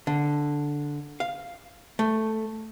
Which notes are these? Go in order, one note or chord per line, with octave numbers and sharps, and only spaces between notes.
D3
F5
A3